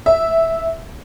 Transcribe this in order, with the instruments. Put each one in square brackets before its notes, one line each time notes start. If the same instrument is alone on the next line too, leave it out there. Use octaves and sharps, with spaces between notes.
[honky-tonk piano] E5